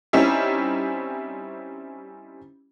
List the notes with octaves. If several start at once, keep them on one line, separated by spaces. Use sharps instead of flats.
G3 C4 C#4 D#4 E4